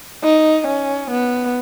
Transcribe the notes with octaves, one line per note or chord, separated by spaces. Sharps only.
D#4
C#4
B3